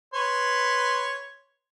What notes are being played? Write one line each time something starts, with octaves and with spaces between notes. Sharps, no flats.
B4 C#5 C6